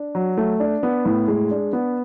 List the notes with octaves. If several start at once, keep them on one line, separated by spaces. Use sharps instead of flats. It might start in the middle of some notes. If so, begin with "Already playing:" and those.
Already playing: D4
F#3
A3
D4
B3
A2
G#3
D4
B3